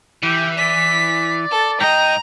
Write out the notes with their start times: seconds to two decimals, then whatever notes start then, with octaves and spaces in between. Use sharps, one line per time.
0.23 E3 G4
0.57 D5 B6
1.51 A4
1.81 G#2 D#5 G5 A#5